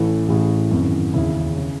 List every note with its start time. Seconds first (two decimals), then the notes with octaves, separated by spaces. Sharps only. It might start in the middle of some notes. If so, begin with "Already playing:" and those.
Already playing: A1 A2 E3 A4
0.28 A1 A2 E3 G#4
0.71 G#1 F#2 E3
1.13 E1 D#2 C#3 E4
1.57 C#3 E3